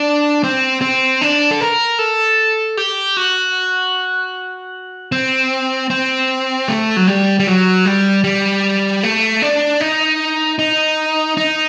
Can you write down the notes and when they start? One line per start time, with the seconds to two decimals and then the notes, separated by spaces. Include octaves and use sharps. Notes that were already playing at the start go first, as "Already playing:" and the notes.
Already playing: D4
0.44 C4
0.81 C4
1.21 D4
1.51 A4
1.61 A#4
1.99 A4
2.77 G4
3.17 F#4
5.12 C4
5.90 C4
6.68 A3
6.97 F#3
7.07 G3
7.40 G3
7.47 F#3
7.85 G3
8.24 G3
9.03 A3
9.42 D4
9.81 D#4
10.59 D#4
11.37 D#4